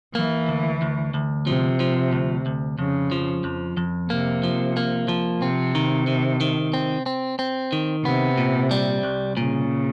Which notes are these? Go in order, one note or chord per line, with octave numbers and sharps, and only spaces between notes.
E3 A#3
D2
D2
D2
C3 F3
F3
D2
D2
F2 C#3
F3
F2
F2
C3 A#3
F3
A#3
F3
C3 C4
D#3
D#3
D#3
C4
C4
C4
D#3
C3 B3
A#2
G3
C2
A#2 C#3